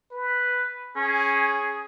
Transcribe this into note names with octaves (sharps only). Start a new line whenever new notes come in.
B4
C#4 G#4